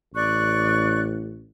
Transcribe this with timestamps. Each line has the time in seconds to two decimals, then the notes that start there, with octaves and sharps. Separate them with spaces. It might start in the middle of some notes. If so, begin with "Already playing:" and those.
0.14 A1 D5 C#6 F#6